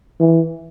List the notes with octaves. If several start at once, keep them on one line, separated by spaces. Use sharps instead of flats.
E3